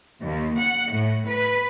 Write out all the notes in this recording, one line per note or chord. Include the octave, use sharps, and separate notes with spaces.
D#2
F#5
A2
B4